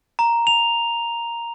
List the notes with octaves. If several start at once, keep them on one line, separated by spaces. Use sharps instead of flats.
A#5
F7